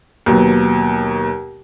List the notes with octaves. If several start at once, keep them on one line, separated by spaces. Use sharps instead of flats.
D#2 B2 F#3